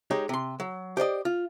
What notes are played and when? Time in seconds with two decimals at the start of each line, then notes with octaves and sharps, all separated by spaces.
0.10 G#3 D#4 G4 C#5
0.29 C3 C6
0.60 F#3
0.97 G4 C5 D5 D#5
1.25 F4